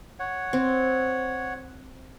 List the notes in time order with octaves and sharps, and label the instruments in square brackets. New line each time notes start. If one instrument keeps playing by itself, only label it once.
[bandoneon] C#5 F#5
[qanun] C4